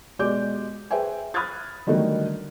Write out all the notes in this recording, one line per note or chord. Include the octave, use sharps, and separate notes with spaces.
B2 G#3 G4 D5 D6 G6
G#4 B4 C5 E5 G5 G#5
B5 D#6 F6 F#6 G#6 A6
D3 D#3 F#3 G3 A3 D#4